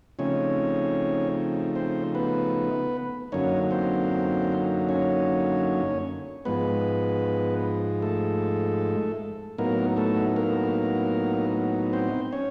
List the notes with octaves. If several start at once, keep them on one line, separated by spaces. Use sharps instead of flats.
C#3 F3 A3 C4 C#4 D#4 C#5
C4 C5
B3 B4
F#2 D3 F#3 A#3 C#4 D#4 C#5
C4 C5
C#4 C#5
G#2 F3 G#3 B3 B4
A3 A4
A2 F#3 A#3 B3 D#4 A#4
A3 A4
A#3 A#4
C4 C5
C#4 C#5